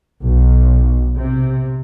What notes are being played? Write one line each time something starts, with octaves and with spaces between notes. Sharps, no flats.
B1
C3